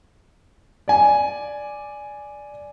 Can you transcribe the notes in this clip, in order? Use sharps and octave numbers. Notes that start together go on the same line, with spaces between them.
D5 G#5